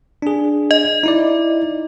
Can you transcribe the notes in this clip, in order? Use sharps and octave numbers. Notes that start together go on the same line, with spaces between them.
D4 G#4
D#5
D#4 E4 D5